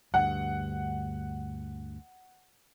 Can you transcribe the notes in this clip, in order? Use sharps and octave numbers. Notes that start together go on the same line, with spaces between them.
D2 G2 F#5